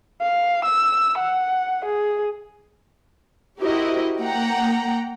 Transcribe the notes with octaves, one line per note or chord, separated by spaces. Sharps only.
F5
E6
F#5
G#4
E4 F#4 G4 A#4 C5 D#5
A#3 F#5 G5 A#5